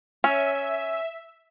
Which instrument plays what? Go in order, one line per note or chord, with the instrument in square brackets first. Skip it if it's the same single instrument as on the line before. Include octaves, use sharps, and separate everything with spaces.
[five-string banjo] C#4 [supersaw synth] E5